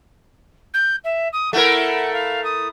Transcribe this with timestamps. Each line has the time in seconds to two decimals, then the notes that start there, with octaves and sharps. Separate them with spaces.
0.74 G6
1.04 E5
1.33 D#6
1.53 A3 E4 A#4 F#5
2.13 F5
2.44 D#6